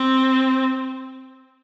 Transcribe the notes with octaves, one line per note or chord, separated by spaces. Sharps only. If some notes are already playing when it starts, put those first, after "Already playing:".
Already playing: C4